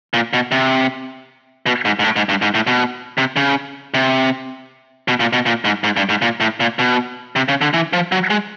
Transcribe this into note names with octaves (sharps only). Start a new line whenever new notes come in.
A#2
B2
C3
B2
G#2
G#2
A2
G#2
G2
G#2
A2
B2
C3
C#3
C3
B2
A#2
B2
A#2
G#2
G#2
G2
G#2
A#2
A2
A#2
B2
C3
C#3
D3
E3
F3
F#3
G#3